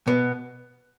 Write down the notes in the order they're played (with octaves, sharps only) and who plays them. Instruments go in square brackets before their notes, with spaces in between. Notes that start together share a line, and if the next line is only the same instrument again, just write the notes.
[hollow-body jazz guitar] B2 B3